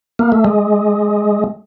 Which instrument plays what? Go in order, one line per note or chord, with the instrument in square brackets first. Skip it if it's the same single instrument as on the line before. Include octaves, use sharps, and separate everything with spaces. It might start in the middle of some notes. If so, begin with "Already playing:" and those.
[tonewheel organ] A#3
A3
G#3